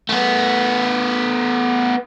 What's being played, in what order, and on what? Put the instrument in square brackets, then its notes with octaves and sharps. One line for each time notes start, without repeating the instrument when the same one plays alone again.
[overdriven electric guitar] A3 B3